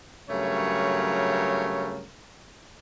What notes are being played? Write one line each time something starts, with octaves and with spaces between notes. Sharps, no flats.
G2 C#3 F#3 A3 A#4 C#5